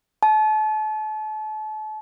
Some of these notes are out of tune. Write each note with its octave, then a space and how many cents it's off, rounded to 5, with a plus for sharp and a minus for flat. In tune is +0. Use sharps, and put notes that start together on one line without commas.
A5 -35